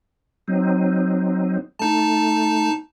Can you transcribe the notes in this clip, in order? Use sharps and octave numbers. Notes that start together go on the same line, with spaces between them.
F#3 C4 D#4
A3 D#4 A5